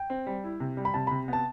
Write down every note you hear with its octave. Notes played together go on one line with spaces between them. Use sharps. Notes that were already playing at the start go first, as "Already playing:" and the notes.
Already playing: G5
C4
G3
E4
C3
G3
B5
C3 A5
C3 B5
B3 A5